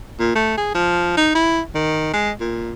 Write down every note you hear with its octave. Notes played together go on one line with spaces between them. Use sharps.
A#2
A3
G#4
F3
D#4
E4
D#3
G#3
A#2